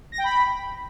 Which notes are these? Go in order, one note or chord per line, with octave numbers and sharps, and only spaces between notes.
A#6
G5
B5